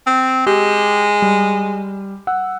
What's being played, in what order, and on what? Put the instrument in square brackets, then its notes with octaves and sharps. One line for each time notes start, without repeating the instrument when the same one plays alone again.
[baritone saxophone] C4
[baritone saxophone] G#3 [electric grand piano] G4
[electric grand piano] G3
F#5 E6